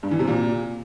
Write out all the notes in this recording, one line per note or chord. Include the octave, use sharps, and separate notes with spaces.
G2
E3
C3
A#2